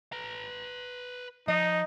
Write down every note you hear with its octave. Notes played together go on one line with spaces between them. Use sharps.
B4 A#5
F3 D#4 D#5